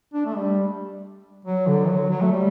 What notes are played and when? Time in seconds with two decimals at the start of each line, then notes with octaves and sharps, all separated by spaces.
0.14 D4
0.26 A3
0.36 G3
1.45 F#3
1.67 D3
1.88 F#3
2.10 F#3
2.21 A3
2.32 G3